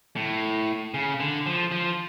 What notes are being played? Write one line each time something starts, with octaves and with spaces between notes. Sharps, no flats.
A2
C#3
D3
F3
F3